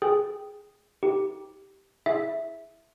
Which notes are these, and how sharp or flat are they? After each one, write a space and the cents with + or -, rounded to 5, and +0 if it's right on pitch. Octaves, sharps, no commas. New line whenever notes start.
G#4 +0 G5 +0
D#4 +35 G4 +0
E4 +0 G#4 +0 E5 +0